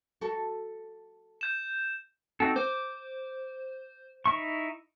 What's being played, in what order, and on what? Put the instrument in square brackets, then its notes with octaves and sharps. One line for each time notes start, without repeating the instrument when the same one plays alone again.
[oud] F#4 A4
[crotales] G6 E7
[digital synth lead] C4 [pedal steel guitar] D#4 F#4 A4
[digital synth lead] C5 [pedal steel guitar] D6
[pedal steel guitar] D#4 E4 C#6